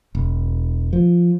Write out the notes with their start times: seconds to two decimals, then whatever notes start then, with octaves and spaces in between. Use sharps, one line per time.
0.15 E1
0.93 F3